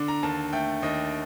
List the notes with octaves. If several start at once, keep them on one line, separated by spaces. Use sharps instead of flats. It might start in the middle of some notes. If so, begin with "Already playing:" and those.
Already playing: D3 D4 D6
A#5
D#2 A5
A3 G5
D#2 D#5